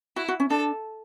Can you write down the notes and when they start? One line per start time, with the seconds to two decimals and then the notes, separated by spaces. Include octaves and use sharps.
0.16 E4 F#4
0.28 F#4
0.40 C#4
0.50 D4 A4